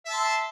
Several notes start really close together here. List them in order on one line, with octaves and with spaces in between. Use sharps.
E5 A5 C6